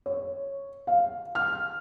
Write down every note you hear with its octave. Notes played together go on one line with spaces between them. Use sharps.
C#5
F5
F6